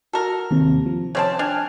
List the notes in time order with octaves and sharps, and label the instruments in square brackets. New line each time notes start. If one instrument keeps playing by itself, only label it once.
[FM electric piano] F#4 [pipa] A4 A#4
[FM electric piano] D#2 C3
F3
[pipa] C#3 C4 A5 [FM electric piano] C#5
[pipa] D4 [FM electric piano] G5 G#5 F6